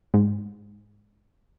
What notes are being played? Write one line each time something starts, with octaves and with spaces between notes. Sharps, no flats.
G#2